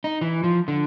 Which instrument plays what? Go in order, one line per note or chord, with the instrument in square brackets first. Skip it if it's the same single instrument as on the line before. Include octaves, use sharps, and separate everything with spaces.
[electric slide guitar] D#4
E3
F3
D3